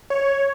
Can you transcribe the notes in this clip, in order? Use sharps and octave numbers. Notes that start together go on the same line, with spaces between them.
C#5